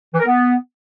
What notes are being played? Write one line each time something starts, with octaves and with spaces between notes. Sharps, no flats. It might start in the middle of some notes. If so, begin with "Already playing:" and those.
E3
A#4
B3